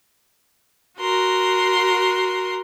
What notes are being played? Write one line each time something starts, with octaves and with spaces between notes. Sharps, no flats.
F#4 A#4 C6